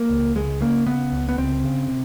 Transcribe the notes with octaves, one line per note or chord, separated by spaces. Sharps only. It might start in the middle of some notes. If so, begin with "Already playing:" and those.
Already playing: A#3
C#2
C#2 G#3
C#3 A#3
C#3 B3
C#2
B3
C#2 C4
C#3
C3